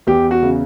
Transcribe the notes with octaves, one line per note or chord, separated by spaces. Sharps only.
E2 G4
F#4
C#3